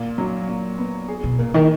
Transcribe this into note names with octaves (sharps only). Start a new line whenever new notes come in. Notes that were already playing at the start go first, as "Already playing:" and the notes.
Already playing: A#2
F#3
A#2
B3
G#4
B2
A#2 A#3
D#3